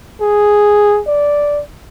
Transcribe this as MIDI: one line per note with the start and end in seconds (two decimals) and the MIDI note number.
0.21 1.01 68
1.07 1.62 74